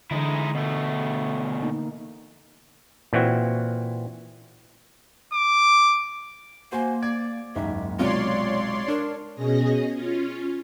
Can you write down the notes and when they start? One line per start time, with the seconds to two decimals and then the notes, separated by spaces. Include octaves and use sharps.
0.11 D3 E3 G#3 D#4 E4
0.55 B2 A3
1.60 A#3 D#4
3.13 A#2 E3 C4 F#4
5.33 D6
6.72 A#3 F#4 C5 G#5
7.02 D5 G#6
7.56 F#1 D#2 G#2 E5
7.99 B1 C3 G#3 F4 C#5 D5 C6
8.88 D4 A#4
9.35 B2 C#4 G#4 D#5 A#6
9.94 C#4 F4